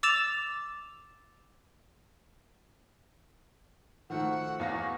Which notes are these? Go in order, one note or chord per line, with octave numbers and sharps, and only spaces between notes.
D6 E6 A6 E7 F7
D#3 F3 A3 F#4 F#5 E6
E2 F#4 C#5 F5 A#6